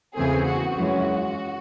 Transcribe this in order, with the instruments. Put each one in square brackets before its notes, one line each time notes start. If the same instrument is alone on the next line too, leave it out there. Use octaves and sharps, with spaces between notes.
[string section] E2 C#3 E3 A3 C4 G#4
F#4
F#2 E3 G#3 C#4 F#4